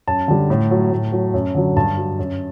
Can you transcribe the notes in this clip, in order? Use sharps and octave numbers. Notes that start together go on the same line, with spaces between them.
F#2 A5
D3 G3
A2
F#3
A2
F#3
F#2
D3 F#3
G2 A5
F#3
F#2